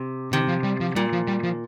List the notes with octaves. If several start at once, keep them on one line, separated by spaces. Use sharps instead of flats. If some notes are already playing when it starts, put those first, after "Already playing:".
Already playing: C3
C3 D#3
F3
G3
F3
A#2 G3
F3
G3
F3